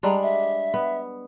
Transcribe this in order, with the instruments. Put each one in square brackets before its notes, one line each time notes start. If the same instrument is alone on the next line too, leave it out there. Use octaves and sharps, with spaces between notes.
[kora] G3 G#3 D4 [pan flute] A#5
[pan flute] E5
[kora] B3